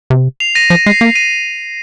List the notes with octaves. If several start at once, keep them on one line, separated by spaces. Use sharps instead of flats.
C3
C7 F7
A#6 D#7
F3 A#6 D#7
G#3 C7
A#3 C7
A#6 D#7